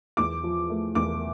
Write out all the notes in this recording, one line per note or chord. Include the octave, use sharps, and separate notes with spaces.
E2 D6
F3
A3
E2 D6